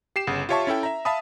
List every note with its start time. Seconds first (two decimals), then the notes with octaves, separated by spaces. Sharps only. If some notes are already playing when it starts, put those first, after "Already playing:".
0.16 G4 C7 E7
0.27 G1 C#3 F#5
0.49 F4 G4 C#5 E5 A5 C#6
0.67 C#4 E4 A4 G5
0.83 E5 A#5
1.05 E5 F5 A5 B5 D#6